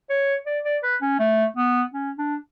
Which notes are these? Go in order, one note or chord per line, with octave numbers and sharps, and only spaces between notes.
C#5
D5
D5
B4
C#4
A3
B3
C#4
D4